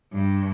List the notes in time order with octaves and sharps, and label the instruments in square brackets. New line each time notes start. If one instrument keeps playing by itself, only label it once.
[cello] G2